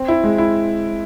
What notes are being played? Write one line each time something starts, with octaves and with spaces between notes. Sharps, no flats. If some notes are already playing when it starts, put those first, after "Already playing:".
Already playing: C4
E4
G#3
E4